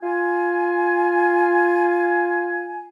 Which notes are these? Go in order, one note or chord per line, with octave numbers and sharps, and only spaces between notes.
F4 G#5